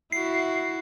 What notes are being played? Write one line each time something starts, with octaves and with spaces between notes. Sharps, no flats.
E4 F#4 C7